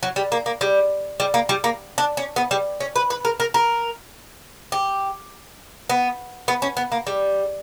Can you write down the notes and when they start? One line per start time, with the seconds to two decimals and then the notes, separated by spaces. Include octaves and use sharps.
0.03 F#3
0.16 G3
0.32 A#3
0.46 A#3
0.61 G3
1.20 G3
1.34 A#3
1.49 G3
1.64 A#3
1.98 D4
2.17 C#4
2.36 B3
2.51 G3
2.81 C#4
2.96 B4
3.10 B4
3.25 A#4
3.40 A#4
3.54 A#4
4.72 G4
5.90 B3
6.48 B3
6.62 C#4
6.77 B3
6.92 A#3
7.07 G3